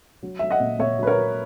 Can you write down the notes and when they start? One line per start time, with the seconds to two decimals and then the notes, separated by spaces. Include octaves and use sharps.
0.23 F#3
0.39 F#3 E5
0.51 D#5 F#5
0.60 A#2
0.79 A#2 C#5 E5
0.98 F#3 B4
1.07 A#4 C#5
1.17 F#3